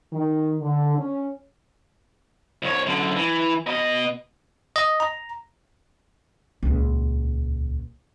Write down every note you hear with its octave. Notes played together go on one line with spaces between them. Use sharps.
D#3
D3
C#4
C2 C#5
F#2 D3
E3
B2 D#5
D#5
A#5
D#1 C#2